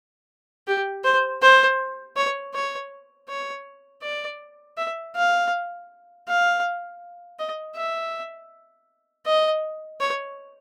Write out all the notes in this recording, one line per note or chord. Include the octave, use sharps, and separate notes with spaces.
G4
C5
C5
C#5
C#5
C#5
D5
E5
F5
F5
D#5
E5
D#5
C#5